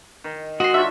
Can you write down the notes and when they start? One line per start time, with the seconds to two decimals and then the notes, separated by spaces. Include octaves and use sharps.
0.24 D#3
0.60 G#3 F#4 D#5 C6
0.74 D4 F4 C#5 E5